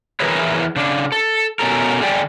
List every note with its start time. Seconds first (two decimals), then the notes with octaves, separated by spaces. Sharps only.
0.20 E3 E4 G#4 A#4 B4 C#5
0.76 C#3 D4
1.12 A4
1.59 B2 C#4 A4 A#4
2.01 D3 G#4 D5 G5